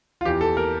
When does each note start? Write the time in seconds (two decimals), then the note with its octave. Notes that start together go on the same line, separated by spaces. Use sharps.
0.21 F4
0.25 E2 E3 G4
0.41 A4
0.57 A#4